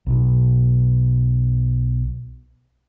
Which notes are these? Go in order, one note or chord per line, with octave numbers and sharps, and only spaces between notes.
B1 B2